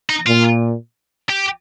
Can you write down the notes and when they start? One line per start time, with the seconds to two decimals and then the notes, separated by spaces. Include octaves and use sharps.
0.10 D#4
0.27 A#2 F4
1.29 G4